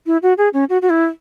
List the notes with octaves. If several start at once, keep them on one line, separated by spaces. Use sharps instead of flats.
E4
F#4
G#4
C#4
F#4
F#4
E4